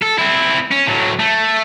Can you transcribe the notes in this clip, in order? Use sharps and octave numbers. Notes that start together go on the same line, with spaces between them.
A4
C4 E4
C#4
A2 F#3
A3